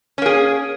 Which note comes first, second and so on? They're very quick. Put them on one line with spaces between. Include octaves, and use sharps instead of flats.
C#4 A#3 G#4